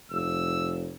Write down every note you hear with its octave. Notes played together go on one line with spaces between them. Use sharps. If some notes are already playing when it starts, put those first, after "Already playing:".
F1 E6